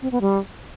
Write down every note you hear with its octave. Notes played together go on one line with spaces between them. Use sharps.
C4
B3
G3